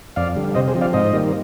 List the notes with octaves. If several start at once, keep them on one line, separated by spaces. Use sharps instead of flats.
F2 D5 F5
D3 G3
C3 C5 D#5
G#4 C5
F3 C4
D5 F5
G#2 C5 D#5
D#3 G3 A#3